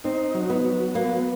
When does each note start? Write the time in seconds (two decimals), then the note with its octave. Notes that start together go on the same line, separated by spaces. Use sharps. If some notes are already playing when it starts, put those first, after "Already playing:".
0.04 C4 D#4
0.34 F#3
0.50 B3
0.65 F#3
0.94 A#3 B3